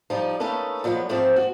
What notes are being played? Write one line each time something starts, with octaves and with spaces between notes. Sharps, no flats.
F3 G3 D#4
A3 A#3 C#4 D#4 A4 B4
A#2 F3 F#3 G#3 B3
F2 G#2 F3 A3 C4 A5
F#4